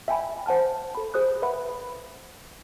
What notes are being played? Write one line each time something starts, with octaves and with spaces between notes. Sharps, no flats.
E5 G5 G#5 B5
C5 F#5 A5 F6
A4 B5
G#4 C5 D#6 F#6
B4 E5 F#5 B5